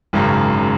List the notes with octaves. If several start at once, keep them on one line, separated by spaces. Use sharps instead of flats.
G#1 F#2 C#3
C#3